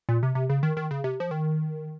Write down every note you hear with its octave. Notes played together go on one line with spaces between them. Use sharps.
A#2
C3
C3
C#3
D#3
D#3
C#3
C3
F3
D#3